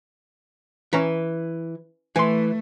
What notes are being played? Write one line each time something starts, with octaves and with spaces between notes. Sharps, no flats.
E3 C#4 A#5 B6
E3 A3 G#5 C6